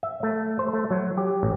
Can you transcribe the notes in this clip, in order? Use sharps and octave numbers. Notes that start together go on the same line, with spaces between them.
E5
A3
C5
A3
F#3
G4
A1